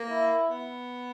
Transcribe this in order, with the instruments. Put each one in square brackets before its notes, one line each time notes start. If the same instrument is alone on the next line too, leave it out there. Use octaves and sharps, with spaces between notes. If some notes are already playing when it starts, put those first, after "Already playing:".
Already playing: [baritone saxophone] A#3
[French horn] E4
[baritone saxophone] B3